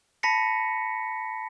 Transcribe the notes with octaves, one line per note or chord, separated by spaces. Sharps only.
A5 B5 A#6 B6 C#7